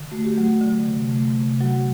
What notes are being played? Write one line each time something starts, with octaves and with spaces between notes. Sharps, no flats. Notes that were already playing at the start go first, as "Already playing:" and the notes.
Already playing: D3
A3 F#4
G4
F#3 A3 F#4
D3
C3
A3
C3
F#3 F#4